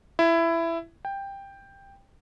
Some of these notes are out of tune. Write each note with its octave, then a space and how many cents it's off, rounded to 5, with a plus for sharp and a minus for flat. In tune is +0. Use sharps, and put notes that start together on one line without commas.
E4 +15
G5 +10